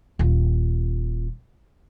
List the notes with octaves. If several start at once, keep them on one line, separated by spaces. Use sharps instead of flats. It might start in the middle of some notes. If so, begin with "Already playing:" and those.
D#1 F4